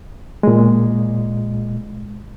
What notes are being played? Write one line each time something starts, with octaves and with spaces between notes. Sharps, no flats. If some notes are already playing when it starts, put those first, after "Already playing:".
A#2 G#3